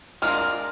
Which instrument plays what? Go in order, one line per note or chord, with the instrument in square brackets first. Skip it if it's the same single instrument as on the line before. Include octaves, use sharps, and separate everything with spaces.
[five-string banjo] G#3 D4 F4 A#4 [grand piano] F6